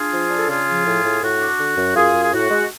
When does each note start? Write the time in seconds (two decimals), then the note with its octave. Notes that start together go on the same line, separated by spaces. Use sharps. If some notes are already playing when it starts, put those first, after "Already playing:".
Already playing: D4 F4 G#4
0.12 F3
0.30 D4
0.37 A4
0.48 C#3 F4 G#4
0.67 F3
0.85 A2
1.03 A2
1.21 A2 F#4
1.40 D4
1.59 D3
1.77 F#2
1.95 F#2 F4 G#4
2.13 F#2
2.22 G#4
2.32 A2 F#4
2.51 G#3